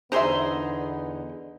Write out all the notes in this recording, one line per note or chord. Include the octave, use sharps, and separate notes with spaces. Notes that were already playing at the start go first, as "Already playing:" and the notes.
E2 D3 B3 D#4 G#4 C5 E5 C6